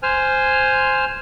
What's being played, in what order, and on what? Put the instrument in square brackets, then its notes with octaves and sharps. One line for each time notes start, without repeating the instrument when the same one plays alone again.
[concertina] C5 G#5 F6